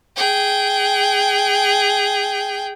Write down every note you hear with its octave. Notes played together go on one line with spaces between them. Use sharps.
G#4 G5